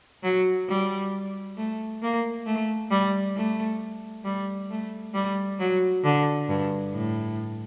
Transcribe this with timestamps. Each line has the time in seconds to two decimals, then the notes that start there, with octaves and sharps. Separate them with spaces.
0.23 F#3
0.69 G3
1.58 A3
2.03 A#3
2.46 A3
2.91 G3
3.37 A3
4.25 G3
4.70 A3
5.14 G3
5.60 F#3
6.04 D3
6.48 G2
6.94 A2